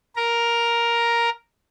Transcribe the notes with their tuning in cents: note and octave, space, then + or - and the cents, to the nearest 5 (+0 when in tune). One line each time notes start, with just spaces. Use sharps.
A#4 +5 A#5 +5